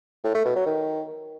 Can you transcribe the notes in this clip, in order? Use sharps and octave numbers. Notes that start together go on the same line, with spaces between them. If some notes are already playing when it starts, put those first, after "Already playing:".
A2
A3
B2
F#3
D#3